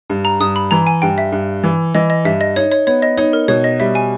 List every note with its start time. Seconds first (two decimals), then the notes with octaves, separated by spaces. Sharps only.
0.10 G2
0.25 A#5
0.40 G2 D#6
0.56 B5
0.71 E3 A#5
0.87 G#5
1.02 G2 G5
1.18 E5
1.32 G2
1.63 E3
1.95 E3 D#5
2.10 D#5
2.25 G2 E5
2.41 D#5
2.56 D#4 C#5
2.72 C#5
2.87 B3 C#5
3.02 D#5
3.17 D#4 C#5
3.33 A#4
3.48 B2 C#5
3.64 D#5
3.80 G3 E5
3.95 G#5